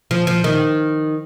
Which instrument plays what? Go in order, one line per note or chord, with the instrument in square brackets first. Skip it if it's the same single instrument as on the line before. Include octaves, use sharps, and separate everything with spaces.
[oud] F3
F3
D#3